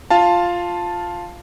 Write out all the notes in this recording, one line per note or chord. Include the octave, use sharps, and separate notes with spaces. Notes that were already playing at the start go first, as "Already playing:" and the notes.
F4 F5 A5